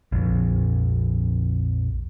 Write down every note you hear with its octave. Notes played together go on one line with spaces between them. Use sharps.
A#1 F2